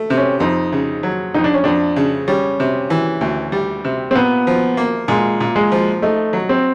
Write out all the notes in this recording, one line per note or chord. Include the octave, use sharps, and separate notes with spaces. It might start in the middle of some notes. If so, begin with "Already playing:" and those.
Already playing: A3
C3
C#4
F2 D#4
C#3
F#3
F2 D#4
D4
C#4
F2 D4
C#3
G3 C#4
C3
E3
D2
G3
C3
C4
A#2 B3
F3
A#3
A#2 G#3
A#2
G#3
F3
A3 D#4
F#3
C4